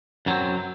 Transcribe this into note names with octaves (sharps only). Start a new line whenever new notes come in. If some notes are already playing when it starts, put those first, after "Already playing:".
F#2 F#3 C4